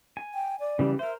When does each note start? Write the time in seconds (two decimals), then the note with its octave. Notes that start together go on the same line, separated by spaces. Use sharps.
0.17 G#5
0.35 G5
0.60 D5
0.79 C#3 E3 G3
0.99 A#4 C5 E5